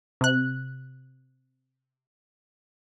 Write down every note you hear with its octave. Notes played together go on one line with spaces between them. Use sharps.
C3 F#6